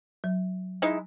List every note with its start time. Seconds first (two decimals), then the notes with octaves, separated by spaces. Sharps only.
0.24 F#3
0.82 G#3 D#4 E4